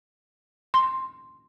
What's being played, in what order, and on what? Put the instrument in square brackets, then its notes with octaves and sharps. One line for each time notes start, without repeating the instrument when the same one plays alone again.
[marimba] C6